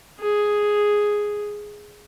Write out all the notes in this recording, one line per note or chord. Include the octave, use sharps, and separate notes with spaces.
G#4